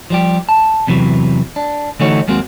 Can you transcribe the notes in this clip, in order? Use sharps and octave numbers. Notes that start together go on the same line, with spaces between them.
F3 G3 G4
A5
E2 C3 E3 F#3
D4
D3 E3 A3 D#4 F#4 C#5
D#2 G#3 A#3 C4 F#4